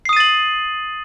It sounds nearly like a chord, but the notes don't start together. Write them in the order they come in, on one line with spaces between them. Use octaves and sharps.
C7 D#6 D#7 A6 F#7